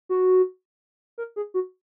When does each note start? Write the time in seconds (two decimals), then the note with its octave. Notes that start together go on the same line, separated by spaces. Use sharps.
0.09 F#4
1.18 A#4
1.36 G#4
1.54 F#4